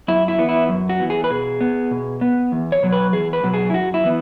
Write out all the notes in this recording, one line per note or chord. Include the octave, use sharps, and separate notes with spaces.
F#2 E4
E4
E3 B3
E4
F#2
F#4
E3 B3
G#4
B4
B2 G#4
B3
B2
B3
E2
C#5
B2 F#3
B4
E2 G#4
B4
B2 F#3
G#4
E4
F#2 F#4
E4
E3 B3